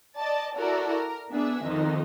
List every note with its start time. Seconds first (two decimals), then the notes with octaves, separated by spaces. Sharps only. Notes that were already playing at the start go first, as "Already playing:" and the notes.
0.18 D5 D#5 A5
0.56 E4 F#4 A4 A#4 D5
0.90 A#4
1.31 B3 D4 G#4 E5
1.64 F2 D#3 D#4